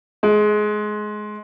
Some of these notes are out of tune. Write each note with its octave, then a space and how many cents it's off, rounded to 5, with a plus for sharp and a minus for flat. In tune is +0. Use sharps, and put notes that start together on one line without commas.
G#3 +20